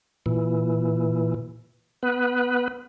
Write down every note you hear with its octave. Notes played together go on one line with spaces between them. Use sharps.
A#2 E3
B3 B4